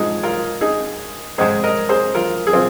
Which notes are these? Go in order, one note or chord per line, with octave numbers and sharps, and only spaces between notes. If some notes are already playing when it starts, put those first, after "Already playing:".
Already playing: G#2 F3 G#3 D#4 G#4
F4 A#4
D#4 G#4
G#2 G#3 G#4 C5
A#4 D#5
G#4 C5
F4 A#4
G#4
C4 F4